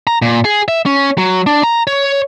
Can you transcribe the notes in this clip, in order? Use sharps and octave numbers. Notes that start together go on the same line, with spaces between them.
A#5
A#2
G#4
E5
C#4
F#3
D4
A#5
C#5